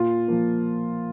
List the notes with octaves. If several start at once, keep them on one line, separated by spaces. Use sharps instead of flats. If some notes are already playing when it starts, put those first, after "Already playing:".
Already playing: A#2 F4
F3 A#3